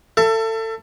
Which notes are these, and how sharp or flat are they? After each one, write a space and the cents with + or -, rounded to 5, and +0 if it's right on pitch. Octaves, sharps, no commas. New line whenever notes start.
A4 +25 E5 +35